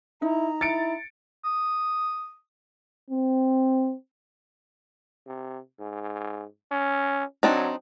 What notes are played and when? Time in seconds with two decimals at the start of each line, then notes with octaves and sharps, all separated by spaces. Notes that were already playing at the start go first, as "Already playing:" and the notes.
0.22 D#4 E4 A#5
0.61 E4 A6 C#7 D7
1.45 D#6
3.10 C4
5.27 C3
5.80 G#2
6.71 C#4
7.43 F#3 C4 D4 D#4